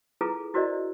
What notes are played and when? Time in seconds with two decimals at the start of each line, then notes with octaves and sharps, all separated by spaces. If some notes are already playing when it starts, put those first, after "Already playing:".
0.21 E4 F4 G#4 A4 B4 A#5
0.54 E4 F#4 A#4 C5 D5 D#5